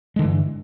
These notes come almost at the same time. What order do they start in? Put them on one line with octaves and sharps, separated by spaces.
G#3 D3 E3 G2